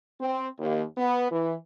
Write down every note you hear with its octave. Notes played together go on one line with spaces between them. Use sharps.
C4
D#2
B3
E3